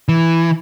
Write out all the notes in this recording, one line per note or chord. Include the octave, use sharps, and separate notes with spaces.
E3